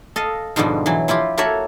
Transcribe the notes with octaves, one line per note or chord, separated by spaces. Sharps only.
A4 D#5 F5
G#2 B2 D3 F3 G3
E3 F#3
F3 E4 F4 G4
A#3 F#4 A4 C#5 E5 F#5